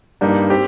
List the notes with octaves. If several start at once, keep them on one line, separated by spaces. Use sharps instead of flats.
G2 G3 A#3 D#4
C4 G4